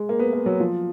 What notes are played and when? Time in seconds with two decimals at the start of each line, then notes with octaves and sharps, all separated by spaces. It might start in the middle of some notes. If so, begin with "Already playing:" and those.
Already playing: G#3
0.09 A#3
0.19 B3
0.33 A#3
0.46 F#3
0.60 F3